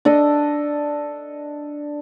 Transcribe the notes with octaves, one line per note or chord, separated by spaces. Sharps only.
D4 A4 D#5